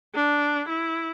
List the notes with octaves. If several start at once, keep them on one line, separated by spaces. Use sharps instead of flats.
D4
E4